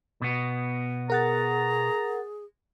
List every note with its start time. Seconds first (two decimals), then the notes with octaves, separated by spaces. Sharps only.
0.21 B2 B3
1.10 G#4 A#4 F#5 A#5 A6